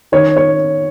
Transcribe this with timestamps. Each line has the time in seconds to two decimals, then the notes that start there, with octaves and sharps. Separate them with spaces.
0.12 D#3 C#5
0.37 C#5